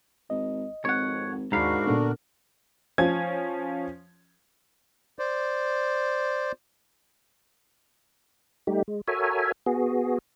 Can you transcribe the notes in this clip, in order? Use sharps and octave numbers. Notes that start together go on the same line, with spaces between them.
G#1 D#5
G#1 F2 C#5 F#5
D#2 G#2 D4 F#4 A#4 F5 A#5 B5
A#2 D3 B3
F3 C#4 G#6
C5 D5
G3 A3 D#4 G4
G#3
F#4 A4 A#4 C#5 E5 G#5
B3 F#4 G#4